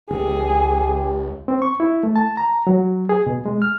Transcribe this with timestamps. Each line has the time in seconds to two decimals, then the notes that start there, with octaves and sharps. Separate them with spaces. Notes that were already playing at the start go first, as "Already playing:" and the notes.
0.11 C#2 G4 G#4
1.48 C4
1.62 C#6
1.80 E4
2.03 A3
2.16 A5
2.37 A#5
2.67 F#3
3.09 G#4
3.27 B2
3.46 G#3
3.62 F6